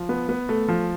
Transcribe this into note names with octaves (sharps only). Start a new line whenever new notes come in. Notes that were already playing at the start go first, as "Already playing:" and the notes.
Already playing: F3
B3
B3
A3
F3